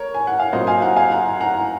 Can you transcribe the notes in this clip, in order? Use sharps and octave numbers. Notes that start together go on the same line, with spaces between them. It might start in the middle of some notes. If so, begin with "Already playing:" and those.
Already playing: A#4 C#5
G#5
F#5
F5
A#2 F#3 C4 C5 D#5
F5 G#5
F#5 A#5
F5 G#5
F#5 A#5
F#5 A#5